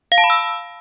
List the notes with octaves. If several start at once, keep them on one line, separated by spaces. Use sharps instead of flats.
F5
A5
B5
E6